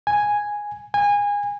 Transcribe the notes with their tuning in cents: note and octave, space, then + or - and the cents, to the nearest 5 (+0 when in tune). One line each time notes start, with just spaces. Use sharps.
G#5 -5
G#5 -25